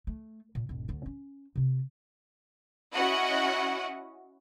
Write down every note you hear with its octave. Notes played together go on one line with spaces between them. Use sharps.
A3
A#2
E1 G#2
D2 F4
C#4
C3 F4
C#4 E4 F#4 D#5 F#5